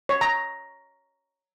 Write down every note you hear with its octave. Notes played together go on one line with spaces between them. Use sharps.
C#5
A#5